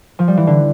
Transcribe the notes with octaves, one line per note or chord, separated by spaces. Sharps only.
F3
G3
E3
D3